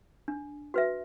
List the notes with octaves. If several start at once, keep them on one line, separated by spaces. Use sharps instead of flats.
D4
F#4 B4 E5